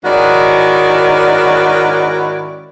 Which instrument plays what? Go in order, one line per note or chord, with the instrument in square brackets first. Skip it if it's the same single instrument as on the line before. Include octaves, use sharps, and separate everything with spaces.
[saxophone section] G#2 D#3 C#4 E4 F#4 D5